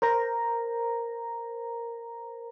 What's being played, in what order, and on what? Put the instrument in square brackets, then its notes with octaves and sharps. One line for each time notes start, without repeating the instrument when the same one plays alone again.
[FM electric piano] A#4 C5 A#5